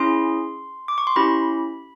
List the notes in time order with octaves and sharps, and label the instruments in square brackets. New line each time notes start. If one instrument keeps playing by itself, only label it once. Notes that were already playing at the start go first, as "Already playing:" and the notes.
Already playing: [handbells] C#4 E4 G#4 C6
D6
C#6
C6
C#4 E4 G4 B5